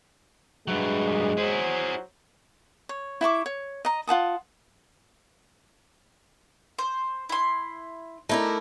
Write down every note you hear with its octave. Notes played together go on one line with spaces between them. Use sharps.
G2 F#3 G#3 B4 E5 F#5
A#2 B3
F#3 E4 G#4 C5
C#5
E4 E5 C#6 D6
C#5
D#5 A#5
F4 F#5 A5 D#6
C5
E4 C6
A3 D#4 E4 A#4 D5